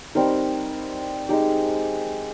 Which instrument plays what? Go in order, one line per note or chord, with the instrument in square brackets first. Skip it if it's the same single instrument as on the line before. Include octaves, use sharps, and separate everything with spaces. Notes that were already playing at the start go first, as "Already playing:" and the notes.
[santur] G3 C4 D#4 A#4
G#3 D#4 G4